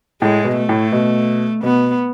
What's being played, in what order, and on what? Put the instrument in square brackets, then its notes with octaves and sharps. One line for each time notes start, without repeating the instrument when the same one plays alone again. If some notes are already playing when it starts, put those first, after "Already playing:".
[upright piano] A2 [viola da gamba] G#3
[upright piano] B2
[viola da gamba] A3
[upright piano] A2
B2
[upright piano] B2 [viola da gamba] B3